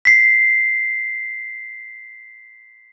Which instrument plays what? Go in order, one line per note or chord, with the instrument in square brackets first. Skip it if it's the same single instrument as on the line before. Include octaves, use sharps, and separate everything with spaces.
[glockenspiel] B6 C7